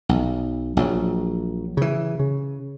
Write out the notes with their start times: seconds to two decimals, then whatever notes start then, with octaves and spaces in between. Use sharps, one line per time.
0.09 B1
0.77 A#1 F#3
1.77 C#3 E3
2.19 C#3